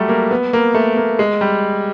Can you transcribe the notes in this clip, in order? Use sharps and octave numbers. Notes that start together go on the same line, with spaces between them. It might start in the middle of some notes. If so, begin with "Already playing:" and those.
Already playing: F#3 G3 A3
A#3
B3
A#3
A3
A#3
G#3
G3